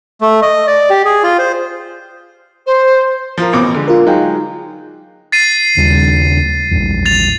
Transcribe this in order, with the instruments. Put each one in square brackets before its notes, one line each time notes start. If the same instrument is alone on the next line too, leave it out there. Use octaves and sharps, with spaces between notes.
[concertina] A3
D#5
D5
G4
G#4
F4
C5
[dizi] C5
[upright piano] F3 F4 A#4
A1 B2 D6
D3 G#3
[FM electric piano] F4 A#4
[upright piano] F#3 G#3 [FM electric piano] D#4 F5 G5
[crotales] A6 C7 D#7
[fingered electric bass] D#2 C#3 G3
A#1 E2
[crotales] A6 F7